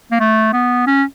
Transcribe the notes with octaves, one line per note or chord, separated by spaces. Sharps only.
A#3
A3
B3
C#4